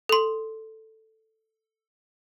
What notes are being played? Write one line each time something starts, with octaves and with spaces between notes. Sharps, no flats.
A4 C6